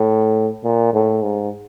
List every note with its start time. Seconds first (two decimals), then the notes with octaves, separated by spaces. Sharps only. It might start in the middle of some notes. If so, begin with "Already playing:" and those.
Already playing: A2
0.64 A#2
0.93 A2
1.23 G#2